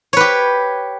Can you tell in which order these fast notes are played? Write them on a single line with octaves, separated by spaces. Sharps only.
C#5 B4 G4